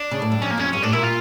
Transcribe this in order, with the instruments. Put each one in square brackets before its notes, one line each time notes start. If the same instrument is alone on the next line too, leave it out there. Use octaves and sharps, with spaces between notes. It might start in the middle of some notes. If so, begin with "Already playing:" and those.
Already playing: [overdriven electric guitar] D4
[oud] C#3
A2
G2
[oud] F2 [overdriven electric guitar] C#4
[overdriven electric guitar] A#3
[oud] F2 [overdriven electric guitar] C#4
[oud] G2 [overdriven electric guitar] C#4
[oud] A2 [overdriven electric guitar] D4
[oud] A#2 [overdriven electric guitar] E4
[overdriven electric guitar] F4